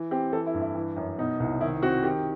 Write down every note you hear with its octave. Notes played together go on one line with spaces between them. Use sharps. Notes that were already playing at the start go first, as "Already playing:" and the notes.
Already playing: E3
C4 G4
E3 A4
E4
G2
E4
E3
F#2
B2 D#4
C2
D#3 E4
C4 F#4
D#3 G4